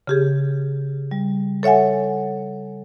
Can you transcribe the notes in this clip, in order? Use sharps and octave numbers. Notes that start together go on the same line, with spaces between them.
C#3 G4 G#4
G3
A4 C#5 E5 F#5 G#5